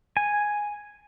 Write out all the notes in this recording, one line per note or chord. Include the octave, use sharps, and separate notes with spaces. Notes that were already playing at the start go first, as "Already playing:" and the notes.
G#5